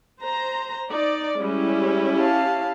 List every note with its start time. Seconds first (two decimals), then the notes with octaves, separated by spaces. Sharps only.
0.23 C5 A#5
0.90 D#4 D5
1.39 G3 G#3 C#4 E4 G4
2.20 F5 A5